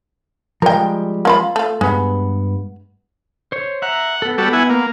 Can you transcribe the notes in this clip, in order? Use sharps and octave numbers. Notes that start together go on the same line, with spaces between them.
F3 G3 G#3 A#4 G5
A#3 F4 B5
A3 F4
G2 G#3 B3
C5 C#5
E5 F#5 A#5
B3 A4
G3 B3 F#4 A4 B4
E4 F#5 G#5
A#3